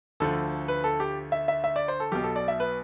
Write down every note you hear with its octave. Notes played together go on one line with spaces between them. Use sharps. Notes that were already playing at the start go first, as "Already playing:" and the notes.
D2 D3 F3 A4
B4
A4
G4
E5
E5
E5
D5
C5
A4
B1 B2 G4
A4
D5
E5
B4